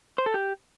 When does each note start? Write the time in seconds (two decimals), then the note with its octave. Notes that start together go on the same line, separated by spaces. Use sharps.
0.18 C5
0.26 A4
0.34 G4